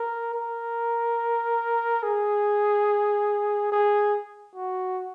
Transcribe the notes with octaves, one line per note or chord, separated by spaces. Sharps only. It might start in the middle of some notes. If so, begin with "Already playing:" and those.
Already playing: A#4
A#4
G#4
G#4
F#4